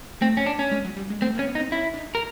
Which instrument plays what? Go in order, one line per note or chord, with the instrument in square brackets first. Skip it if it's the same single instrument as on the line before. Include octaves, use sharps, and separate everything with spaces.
[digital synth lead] A3 [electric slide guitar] C4
[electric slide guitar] C#4
D4
C#4
[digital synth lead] G#3
F#3
G3
G#3
[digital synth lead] A3 [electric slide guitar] C4
[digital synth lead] A#3
[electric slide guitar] C#4
[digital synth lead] B3
[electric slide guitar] D#4
[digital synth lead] C4
[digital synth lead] C#4 [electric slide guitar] E4
[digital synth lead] D4
D#4
[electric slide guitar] A#4